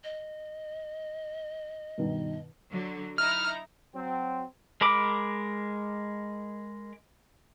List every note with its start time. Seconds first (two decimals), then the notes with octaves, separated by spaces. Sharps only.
0.04 D#5
1.98 G2 B2 D#3
2.71 D3 F#3
3.18 D#4 E4 A#5 F6
3.94 F#3 C4
4.81 G#3 A#4 B5 D6